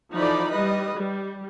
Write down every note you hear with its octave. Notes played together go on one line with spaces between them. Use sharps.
E3 F3 D#4 A4 D5 B5
G3 B4 D#5
G3